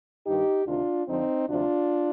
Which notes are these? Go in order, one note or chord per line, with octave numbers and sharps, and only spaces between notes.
G2 D#3 D#4 G4
D2 C3 D#3 D4 F4
F2 D3 F3 C4 D#4
D2 C3 F3 D4 F4